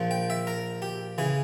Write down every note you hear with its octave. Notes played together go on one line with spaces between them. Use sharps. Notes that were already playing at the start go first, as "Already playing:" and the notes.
Already playing: A#1 A#2 F3
G5
E5
A#4
G4
C#3 E3 G#4